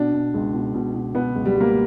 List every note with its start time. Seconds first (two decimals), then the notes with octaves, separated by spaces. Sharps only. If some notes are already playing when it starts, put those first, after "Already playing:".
Already playing: B2 D4
0.14 B2
0.34 C#2
0.54 B2
0.74 B2
0.95 B2
1.15 B2 B3
1.35 C#2
1.45 G3
1.56 C#2
1.61 A#3